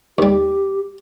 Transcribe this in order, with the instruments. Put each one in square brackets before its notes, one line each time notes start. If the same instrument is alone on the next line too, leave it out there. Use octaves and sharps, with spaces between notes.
[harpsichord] D#2 G3 [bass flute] G4